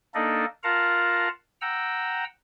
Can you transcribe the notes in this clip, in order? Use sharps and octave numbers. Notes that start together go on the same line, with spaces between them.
A#3 D4 D#4 A4 D5 D#5
F4 A#4 F5 F#5 A5 A#5
F#5 G5 A#5 E6